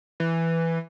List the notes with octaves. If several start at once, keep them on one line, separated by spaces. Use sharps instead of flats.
E3